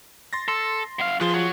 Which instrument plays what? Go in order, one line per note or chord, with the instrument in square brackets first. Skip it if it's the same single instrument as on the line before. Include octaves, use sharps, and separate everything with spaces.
[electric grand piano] C6 A6 A#6
[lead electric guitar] A4 [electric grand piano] C6
[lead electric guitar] F#2 F5
[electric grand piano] F3 F4 G#4 [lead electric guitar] B4 C6
[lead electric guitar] F#4 C#5